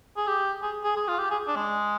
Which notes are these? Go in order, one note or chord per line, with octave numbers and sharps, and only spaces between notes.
G#4
G4
G#4
G#4
G#4
F4
G4
G#4
D4
G#3